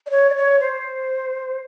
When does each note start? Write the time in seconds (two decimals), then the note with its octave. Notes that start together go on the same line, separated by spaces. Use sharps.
0.06 D5
0.11 C#5
0.30 D5
0.36 C#5
0.60 C5